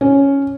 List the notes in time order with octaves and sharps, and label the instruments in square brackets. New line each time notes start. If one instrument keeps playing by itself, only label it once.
[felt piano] C#4